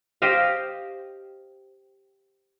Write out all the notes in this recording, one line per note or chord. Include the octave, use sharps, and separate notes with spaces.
G4 C5 D#5 F5